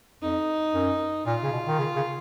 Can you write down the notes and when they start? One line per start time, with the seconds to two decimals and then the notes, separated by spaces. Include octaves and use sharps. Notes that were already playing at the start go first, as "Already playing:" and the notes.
0.22 F2 D#4
0.74 F#2
1.26 A#2 F4
1.43 C#3
1.52 B2
1.67 D#3
1.79 C#3
1.96 C#3